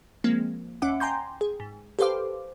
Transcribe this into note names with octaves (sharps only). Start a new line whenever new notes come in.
F3 G#3 A#3 C4
D#2 C#4 E5 F#5 D6
G5 G#5 A#5 C6 G6
G#4
G#2
G4 A4 B4 C5 F5 D6